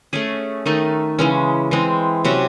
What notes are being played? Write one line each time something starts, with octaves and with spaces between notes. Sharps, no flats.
A3 C#4 G#4
D#3 A3 D#4
C#3 E3 G#3 C#4
E3 G#3 C4
C3 F#3 C#4